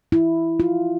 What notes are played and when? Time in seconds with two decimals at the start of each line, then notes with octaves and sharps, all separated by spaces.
0.12 E4
0.60 F4